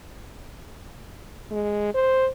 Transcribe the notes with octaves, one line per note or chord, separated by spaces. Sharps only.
G#3
C5